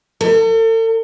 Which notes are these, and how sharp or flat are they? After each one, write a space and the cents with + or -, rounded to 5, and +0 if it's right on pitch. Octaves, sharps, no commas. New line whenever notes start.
A4 +40